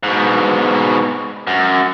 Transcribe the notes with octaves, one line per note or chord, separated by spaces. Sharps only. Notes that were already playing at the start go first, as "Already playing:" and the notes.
G#2 B2
F#2